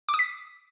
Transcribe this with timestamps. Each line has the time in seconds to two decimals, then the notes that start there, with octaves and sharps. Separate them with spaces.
0.09 D6
0.14 D#6
0.19 B6